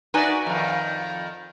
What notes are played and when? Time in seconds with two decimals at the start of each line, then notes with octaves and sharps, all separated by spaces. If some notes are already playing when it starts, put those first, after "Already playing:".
0.14 D#4 F#4 B4 D5 E5 G#5
0.46 F2 D#3